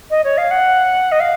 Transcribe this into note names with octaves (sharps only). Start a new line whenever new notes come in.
D#5
C#5
F5
F#5
D#5
F5